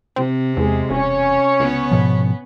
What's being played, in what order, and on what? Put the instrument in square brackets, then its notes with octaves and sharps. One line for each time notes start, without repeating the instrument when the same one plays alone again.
[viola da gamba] C3 [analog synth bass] C4
[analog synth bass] E2 [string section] G#3
[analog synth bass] E1 [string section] C#4 C#5
[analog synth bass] C#2 [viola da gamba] B3
[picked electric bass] G#2 B2 F3